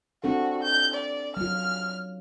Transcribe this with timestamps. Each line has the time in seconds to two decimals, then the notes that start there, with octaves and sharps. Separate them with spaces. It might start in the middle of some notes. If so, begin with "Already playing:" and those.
0.24 C4 D4 F#4 A4
0.63 G6
0.94 D5
1.37 F#3 F4 F6